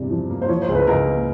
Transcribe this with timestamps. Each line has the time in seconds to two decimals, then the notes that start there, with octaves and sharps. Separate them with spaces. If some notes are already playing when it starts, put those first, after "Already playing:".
Already playing: E2 G2 C3
0.10 F3
0.30 A#3
0.42 C5
0.48 F3 C#5
0.62 C5
0.68 C#2
0.75 B4
0.87 C#2 A#4
1.07 A#3